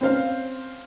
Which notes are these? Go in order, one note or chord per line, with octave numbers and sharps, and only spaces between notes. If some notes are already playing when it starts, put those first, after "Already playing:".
C4 C#4 C5 F5